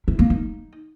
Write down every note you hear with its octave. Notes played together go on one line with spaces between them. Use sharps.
E4
A#3
D#4